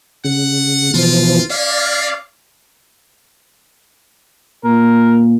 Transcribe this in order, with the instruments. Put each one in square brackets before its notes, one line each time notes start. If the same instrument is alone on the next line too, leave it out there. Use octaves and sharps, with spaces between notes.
[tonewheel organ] C#3 [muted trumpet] F#5
[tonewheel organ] B2 E3 F3 [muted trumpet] F4
[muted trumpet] C#4 [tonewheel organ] D5 F5
[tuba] A#2 [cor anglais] A#4